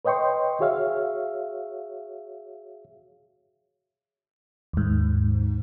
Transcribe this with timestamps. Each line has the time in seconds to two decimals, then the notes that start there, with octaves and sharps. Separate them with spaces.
0.05 B4 C#5 D#5 G5 C6 C#6
0.60 F#4 G#4 C#5 E5 F5
4.73 D#2 G#2